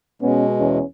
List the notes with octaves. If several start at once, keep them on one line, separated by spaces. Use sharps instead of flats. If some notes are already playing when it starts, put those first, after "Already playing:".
B2 G#3 B3 C#4
E2 C#4